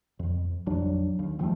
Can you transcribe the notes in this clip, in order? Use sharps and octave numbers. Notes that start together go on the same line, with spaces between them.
F2
A1 F2 F#3 D4
D#2
F#1 F3 G3 A3